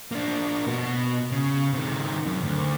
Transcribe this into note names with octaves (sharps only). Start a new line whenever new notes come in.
A#3 D4
B2 F#4
C#3
C3 D#3
F#2
D2